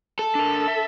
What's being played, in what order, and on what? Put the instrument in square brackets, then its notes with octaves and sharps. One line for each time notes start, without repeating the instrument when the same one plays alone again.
[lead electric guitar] A4
[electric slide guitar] D4 A#4
E5